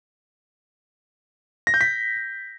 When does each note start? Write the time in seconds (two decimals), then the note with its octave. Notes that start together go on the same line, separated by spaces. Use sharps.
1.67 A#6
1.74 G6
1.81 B6